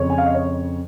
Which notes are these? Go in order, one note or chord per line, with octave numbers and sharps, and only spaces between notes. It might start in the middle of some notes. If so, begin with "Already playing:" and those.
Already playing: F2 C#3 C#5
G#5
F5
D#5
C#5